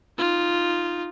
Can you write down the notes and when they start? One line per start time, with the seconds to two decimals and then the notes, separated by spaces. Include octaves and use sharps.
0.18 D#4 F4